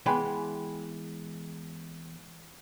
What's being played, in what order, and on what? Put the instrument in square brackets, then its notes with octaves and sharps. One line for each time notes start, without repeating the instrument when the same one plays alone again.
[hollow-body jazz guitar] E3 G#3 B3 G5 G#5 B5